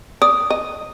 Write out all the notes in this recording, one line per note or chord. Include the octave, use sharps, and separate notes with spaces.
D5 D#6
D#5